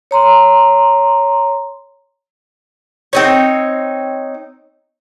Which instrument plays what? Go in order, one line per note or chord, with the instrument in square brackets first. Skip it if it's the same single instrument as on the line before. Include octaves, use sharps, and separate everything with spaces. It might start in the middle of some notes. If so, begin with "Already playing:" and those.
[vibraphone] C#5 A#5 C6
[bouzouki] C4 D#4 C#5